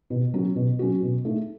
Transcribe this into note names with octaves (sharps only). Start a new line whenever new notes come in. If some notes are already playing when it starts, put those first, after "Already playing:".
B2
F#3 C#4 F#4
B2
F#3 C#4 F#4
B2
A3 D#4